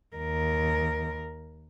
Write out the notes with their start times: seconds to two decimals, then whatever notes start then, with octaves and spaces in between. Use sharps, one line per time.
0.17 D#2 A#4